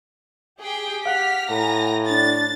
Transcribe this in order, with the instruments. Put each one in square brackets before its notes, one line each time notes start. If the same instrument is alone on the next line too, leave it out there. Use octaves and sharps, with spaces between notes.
[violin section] G4 G#4 G5
[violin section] G4 F6 B6 [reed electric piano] F5 F#5
[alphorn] A2 [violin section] G#5 A#5 A#6
[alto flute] D4 [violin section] A6